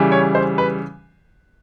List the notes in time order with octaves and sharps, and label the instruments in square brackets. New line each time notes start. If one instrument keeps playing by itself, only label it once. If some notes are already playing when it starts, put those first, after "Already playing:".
Already playing: [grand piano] C#3 E3 G3
C#5
C5
B4